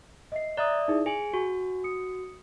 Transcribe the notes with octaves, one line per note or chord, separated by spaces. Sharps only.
D#5 E5 C7
D5 E5 A#5 D#6 F#6 A6
D#4 E4 G#4
G#4 G#5 D7 F#7
F#4 G#5 C#6
D#6 C#7